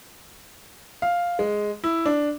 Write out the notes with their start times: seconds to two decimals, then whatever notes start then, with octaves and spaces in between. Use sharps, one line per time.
1.02 F5
1.39 G#3
1.84 E4
2.06 D4